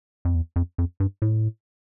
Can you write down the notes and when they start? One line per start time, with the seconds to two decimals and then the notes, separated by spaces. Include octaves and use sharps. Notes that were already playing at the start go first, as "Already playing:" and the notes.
0.25 F2
0.35 E2
0.56 F2
0.78 F2
1.00 G2
1.22 A2